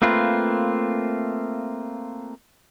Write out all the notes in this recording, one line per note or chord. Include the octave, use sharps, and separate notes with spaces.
A3 A#3 C4 F4 B4